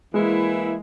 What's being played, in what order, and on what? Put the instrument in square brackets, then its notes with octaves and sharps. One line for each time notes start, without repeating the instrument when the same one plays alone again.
[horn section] E3 A#3 E4 [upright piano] G#3